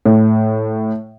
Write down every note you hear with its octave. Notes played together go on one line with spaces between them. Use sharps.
A2